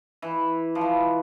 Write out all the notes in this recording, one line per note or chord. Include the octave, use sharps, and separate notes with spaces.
E3
F3
E3